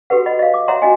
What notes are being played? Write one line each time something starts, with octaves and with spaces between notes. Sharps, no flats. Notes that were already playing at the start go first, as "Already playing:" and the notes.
F#4 G4 A4 B4 F#5
D#5 F#5 B5
D#5 F5
D6
C#5 D#5 E5 F#5 A#5 C6
C#4 F4 F#4 D#5 G5 G#5